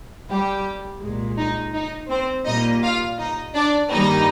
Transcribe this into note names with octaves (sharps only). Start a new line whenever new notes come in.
G3 G4
C2 A#2 G#3
D#4
D#4
C4 C5
A#2 G3 A#3 D#4 D#5
F4 F5
D#4 D#5
D4 D5
G2 D#3 G3 A#3 D#4 D#5